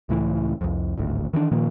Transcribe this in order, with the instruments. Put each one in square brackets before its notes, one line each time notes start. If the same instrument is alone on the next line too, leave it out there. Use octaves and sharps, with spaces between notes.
[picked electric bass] C#2 A2 E3
C2 F2
D1 G#1 D2
D#3 E3 G#3 D4
A#2 D#3 F3 A#3